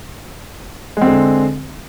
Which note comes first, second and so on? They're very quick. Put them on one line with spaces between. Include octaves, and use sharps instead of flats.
G#3 C4 D3